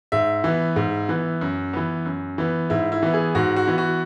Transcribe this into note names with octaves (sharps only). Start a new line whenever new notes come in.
G#2 E5
E3 B3
G#2
E3 B3
F#2
E3 B3
F#2
E3 B3
G#2 E4
E4
E3 B3
G#4
G#2 F#4
F#4
E3 B3
F#4